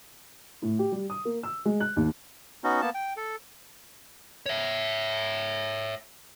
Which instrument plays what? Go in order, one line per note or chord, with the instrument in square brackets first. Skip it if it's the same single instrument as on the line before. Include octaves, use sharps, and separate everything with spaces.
[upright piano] A2
G4
G3
D#6
A#3
E6
G#3
F#6
D#2
[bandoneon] B3 C#4 D#4 F#4
A#3 B3 A5
G5
A4
[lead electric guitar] C#5 E5